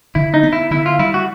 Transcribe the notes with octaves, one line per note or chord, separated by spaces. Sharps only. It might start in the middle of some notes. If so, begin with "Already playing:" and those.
D3 E4
D#4
B3
E4
D3 E4
F4
G3 E4
F#4